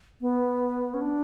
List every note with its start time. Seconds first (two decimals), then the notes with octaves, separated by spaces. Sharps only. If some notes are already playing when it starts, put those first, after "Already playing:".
0.21 B3
0.94 C#4
1.01 D4